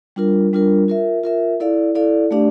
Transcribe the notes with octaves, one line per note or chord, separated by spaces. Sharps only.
G3 D4 F4 A#4
G3 D4 F4 A#4
F4 A#4 E5
F4 A#4 E5
E4 A4 D5 F5
E4 A4 D5 F5
A3 D4 G4 D5 F5